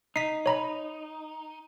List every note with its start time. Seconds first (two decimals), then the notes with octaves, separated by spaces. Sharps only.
0.16 D#4 B6 C7
0.46 C#5 A#5 B5